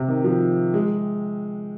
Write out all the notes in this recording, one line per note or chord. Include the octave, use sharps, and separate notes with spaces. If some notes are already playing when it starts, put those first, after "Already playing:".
Already playing: C3
D#3
F3
G#3